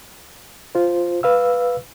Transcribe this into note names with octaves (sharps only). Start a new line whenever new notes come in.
F4 C5
B4 F5 E6